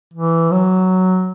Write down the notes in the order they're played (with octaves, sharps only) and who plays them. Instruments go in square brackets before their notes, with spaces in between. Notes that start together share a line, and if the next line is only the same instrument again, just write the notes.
[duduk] E3
F#3